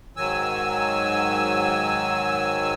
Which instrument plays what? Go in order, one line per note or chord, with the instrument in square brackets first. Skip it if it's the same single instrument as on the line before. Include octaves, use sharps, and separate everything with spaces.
[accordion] G#2 D#3 F#3 G#5 E6